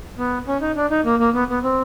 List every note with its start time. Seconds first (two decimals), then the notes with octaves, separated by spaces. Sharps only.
0.18 B3
0.47 C#4
0.61 D#4
0.76 D4
0.91 D#4
1.05 A#3
1.19 A#3
1.34 B3
1.49 B3
1.63 C4